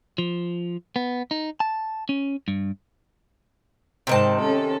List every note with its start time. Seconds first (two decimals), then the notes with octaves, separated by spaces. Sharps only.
0.18 F3
0.96 B3
1.31 D#4
1.60 A5
2.09 C#4
2.48 G2
4.07 G#2 C3 D#3 C4 A5
4.40 C#4 A4